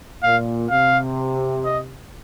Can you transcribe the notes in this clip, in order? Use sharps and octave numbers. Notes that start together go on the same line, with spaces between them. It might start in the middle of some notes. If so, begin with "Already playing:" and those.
A#2 F5
C3 F5
D#5